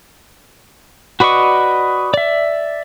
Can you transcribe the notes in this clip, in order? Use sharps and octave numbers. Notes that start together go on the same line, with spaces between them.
F#4 B4 D5 D#5 C#6
D5 E5